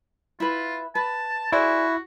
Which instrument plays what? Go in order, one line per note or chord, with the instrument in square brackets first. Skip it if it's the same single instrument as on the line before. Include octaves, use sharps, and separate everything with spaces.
[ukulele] E4 B4 [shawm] F4
[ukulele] B4 [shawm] A5
[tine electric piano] E4 [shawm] F#4 [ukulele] G#4 C5 D5